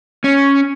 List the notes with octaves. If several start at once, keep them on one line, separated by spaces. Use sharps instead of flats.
C#4